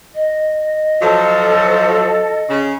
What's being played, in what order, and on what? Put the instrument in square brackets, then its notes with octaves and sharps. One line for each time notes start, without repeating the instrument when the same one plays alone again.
[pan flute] D#5
[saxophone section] F3 F#3 [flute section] A4
[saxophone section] C#3